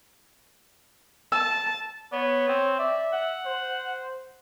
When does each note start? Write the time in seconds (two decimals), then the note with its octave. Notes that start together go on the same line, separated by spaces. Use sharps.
1.32 A5 E6
2.13 B3 C#5
2.49 C4
2.79 D5 E5
3.13 F#5
3.46 C5